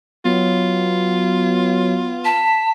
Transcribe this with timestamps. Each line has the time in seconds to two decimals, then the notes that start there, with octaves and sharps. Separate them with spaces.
0.25 F#3 B3 F4
2.25 A5 B6